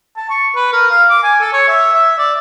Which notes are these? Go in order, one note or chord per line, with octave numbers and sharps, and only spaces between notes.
A5
C#6
B4
A#4
F5
D6
G#5
A4
C#5
E5
E5
D5